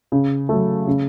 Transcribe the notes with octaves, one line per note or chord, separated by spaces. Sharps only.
C#3
F#3 A3
C#3